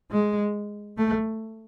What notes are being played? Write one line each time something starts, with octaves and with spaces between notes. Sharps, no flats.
G#3
A3